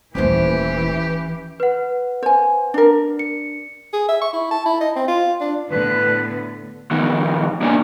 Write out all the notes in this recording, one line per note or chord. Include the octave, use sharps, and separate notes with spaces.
D#1 E3 A3 C#4 G4 B4 C5
B4 F#5
C5 G#5
D4 A#4
C#7
G#4
E5
C#6
E4
A5
E4
D#5
C4
F4
D4
A2 D3 B3 B4
D#3 F3 B3 D#4
A#3 D4 D#4 C#5 D5 G#5